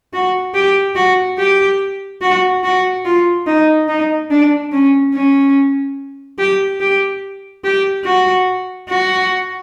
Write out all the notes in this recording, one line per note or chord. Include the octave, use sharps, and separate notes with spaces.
F#4
G4
F#4
G4
F#4
F#4
F4
D#4
D#4
D4
C#4
C#4
G4
G4
G4
F#4
F#4